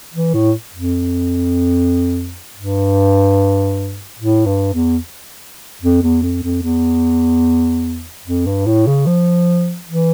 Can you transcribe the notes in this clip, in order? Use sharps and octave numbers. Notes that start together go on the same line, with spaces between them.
E3
A2
F2
G2
A2
G2
E2
F2
E2
F2
F2
E2
F2
G2
A2
C#3
F3
E3